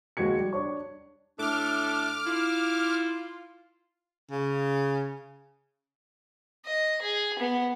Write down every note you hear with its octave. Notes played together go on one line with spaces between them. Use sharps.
D#2 G#3 F#4 G#6 C#7
G3
D4 C#5 C#6
A2 A3 D4 D6 F6
E4 F4
C#3
D#5
G#4
B3